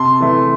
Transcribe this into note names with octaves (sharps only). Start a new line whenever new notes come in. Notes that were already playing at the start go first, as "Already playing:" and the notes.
Already playing: C3 A5 C6
E3 A3